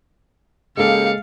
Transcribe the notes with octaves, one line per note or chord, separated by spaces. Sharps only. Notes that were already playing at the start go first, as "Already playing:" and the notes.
C#3 G#3 A#3 G4 A4 F5 C#7